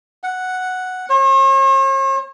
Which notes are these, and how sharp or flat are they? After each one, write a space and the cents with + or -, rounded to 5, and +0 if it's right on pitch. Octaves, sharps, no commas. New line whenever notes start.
F#5 +0
C#5 -45